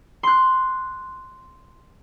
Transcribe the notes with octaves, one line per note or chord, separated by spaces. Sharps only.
C6 F#6